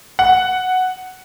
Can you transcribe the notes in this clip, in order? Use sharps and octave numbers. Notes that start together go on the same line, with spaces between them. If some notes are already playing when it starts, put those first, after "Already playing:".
F#5